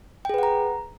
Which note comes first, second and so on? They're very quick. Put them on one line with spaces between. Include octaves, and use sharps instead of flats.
G5 G#4 B4 F#5 A#5